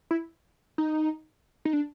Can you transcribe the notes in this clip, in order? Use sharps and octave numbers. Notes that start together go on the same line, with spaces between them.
E4
D#4
D#4
D4